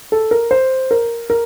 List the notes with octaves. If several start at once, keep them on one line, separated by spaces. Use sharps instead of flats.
A4
A#4
C5
A#4
A#4